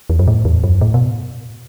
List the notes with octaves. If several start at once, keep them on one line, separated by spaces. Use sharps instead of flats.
E2
F#2
A2
E2
F#2
A2
B2